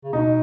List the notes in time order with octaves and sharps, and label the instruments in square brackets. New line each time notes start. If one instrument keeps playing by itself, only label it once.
[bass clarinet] C#3
[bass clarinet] B2 [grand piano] D#4